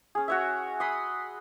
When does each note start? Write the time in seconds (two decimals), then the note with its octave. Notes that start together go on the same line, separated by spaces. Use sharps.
0.15 C#4 G#4
0.28 F#4 C#5 E5
0.80 B5 C6 D#6